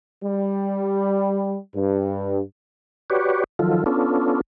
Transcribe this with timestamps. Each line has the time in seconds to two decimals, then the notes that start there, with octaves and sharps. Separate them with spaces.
0.24 G3
1.75 G2
3.10 F#4 G4 B4 C#5 D5
3.59 D#3 F3 F#3 F4 A4
3.86 B3 C#4 D4 F4 A4